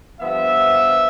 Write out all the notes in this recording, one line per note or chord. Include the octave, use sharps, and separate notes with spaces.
G2 F3 B3 E5